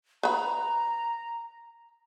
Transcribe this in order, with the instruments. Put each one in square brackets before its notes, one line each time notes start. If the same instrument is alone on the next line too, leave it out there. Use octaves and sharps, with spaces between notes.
[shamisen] B4 B5 [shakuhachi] A#5